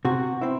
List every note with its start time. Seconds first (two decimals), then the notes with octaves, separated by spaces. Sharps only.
0.05 C3 F#4
0.41 C4 E4